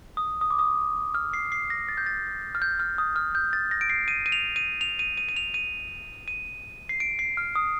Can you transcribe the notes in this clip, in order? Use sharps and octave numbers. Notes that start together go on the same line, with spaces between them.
D#6
D#6
D6
D#6
F6
C7
C7
A#6
A6
G6
A6
F6
G6
F6
D#6
F6
G6
A6
A#6
D7
C7
D#7
D#7
F7
D#7
F7
D#7
D#7
D#7
F7
D#7
D#7
C7
D7
C7
F6
D#6